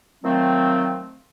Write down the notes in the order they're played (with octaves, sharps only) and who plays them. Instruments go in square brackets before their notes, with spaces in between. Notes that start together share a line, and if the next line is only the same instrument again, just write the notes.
[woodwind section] D#3 F3 F#3 A3 C4